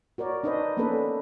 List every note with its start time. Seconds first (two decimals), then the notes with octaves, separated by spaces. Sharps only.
0.18 F#4 A#4 C#5 D5
0.44 D4 D#4 B4 C5 D#5
0.77 A#3 B3 C#4 D4 A4 B4